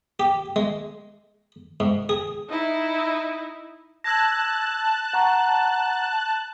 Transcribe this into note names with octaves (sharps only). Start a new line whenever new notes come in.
G4
G#3
G#2
G#4
D#4 E4
A5 E6 F#6 G#6 A#6
F#5 A#5 C#6